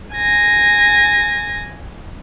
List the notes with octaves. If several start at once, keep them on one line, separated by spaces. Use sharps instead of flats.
G#5 A#6